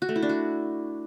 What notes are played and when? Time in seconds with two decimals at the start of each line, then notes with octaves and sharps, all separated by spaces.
0.02 F#4
0.09 A3
0.16 E4
0.22 D4
0.29 F#4